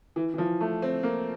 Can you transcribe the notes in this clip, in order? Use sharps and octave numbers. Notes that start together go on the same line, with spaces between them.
E3
E3
F3
A3
C4
A#3